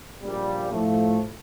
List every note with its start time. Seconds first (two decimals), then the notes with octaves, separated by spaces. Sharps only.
0.23 A#1 A#2 G3
0.71 A2 F3 A3